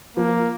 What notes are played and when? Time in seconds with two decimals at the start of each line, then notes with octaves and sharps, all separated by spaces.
0.17 F3 A#3